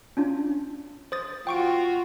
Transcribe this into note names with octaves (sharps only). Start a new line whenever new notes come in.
C#4 D4 F4
C5 D#6 A6
F4 F#4 G5 C#6 D7